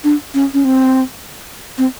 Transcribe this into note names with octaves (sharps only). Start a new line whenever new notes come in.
D4
C#4
C#4
C4
C4